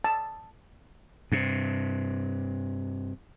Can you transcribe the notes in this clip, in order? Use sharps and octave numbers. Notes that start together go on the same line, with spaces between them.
A5
G2 C3